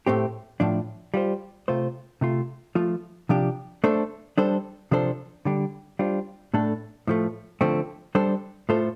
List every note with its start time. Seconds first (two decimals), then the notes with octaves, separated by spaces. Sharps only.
0.07 A2 A3 C4 G4
0.60 A2 F3 D4
1.14 G3 F4 C5
1.68 C3 A3 F4 C5
2.21 C3 A3 F4
2.75 F3 A3 F4
3.29 C3 F3 D4 G4
3.84 A3 D4 A4 C5
4.38 G3 D4 A4 C5
4.91 C3 F3 D4 A4 C5
5.45 D3 G3 D4
5.99 G3 D4 F4 C5
6.54 A2 A3 D4 A4
7.07 A2 F3 A3
7.61 D3 F3 A3 C4
8.15 G3 D4 A4 C5
8.69 A2 A3 F4 A4 C5